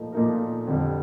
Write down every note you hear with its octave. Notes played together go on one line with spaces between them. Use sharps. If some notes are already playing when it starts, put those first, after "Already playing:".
Already playing: A#2 F3 A3 D#4 A#4
A#2 F3 A3 D#4 A#4
F2 D3 G3